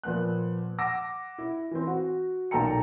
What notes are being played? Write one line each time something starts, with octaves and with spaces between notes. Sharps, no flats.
A#2 F3 B3 F#6
F#5 D6 E6 A#6
E4
E3 C4
F#4
B1 A#2 A4 G5 A#5 C#7